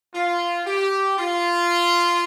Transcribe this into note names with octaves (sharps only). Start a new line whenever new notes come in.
F4
G4
F4